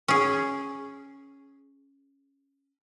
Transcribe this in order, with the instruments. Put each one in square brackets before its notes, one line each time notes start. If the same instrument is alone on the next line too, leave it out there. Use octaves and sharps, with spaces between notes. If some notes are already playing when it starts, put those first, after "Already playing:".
[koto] C#4 G#4